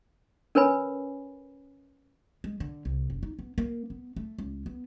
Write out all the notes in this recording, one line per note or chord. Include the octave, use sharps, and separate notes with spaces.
C#4 A#4 B4 C#5 G#5 B5
G#3
D3
C2
F#1
D#4
B3
A#3
B3
A3
C#2
B3